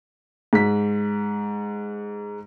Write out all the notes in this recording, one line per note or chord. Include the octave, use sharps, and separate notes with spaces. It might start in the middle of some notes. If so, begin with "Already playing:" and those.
G#2 B6